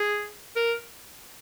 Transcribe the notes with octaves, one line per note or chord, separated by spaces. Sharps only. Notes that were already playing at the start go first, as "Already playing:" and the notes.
Already playing: G#4
A#4